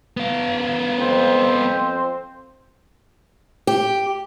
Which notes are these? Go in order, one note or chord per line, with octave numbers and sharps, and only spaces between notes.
B3 F5
F2 C4 C5
G4